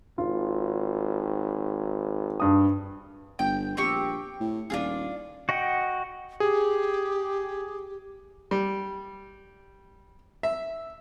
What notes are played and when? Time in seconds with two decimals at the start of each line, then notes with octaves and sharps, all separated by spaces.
0.18 G#1 F4
2.40 G2 D#6
3.39 G1 G5
3.77 A#1 C4 G4 C#6
4.40 A2
4.70 D#1 D4 F4 G#4
5.49 F#4 D#5 F#5 G5
6.40 G4 G#4
8.51 G3
10.43 E5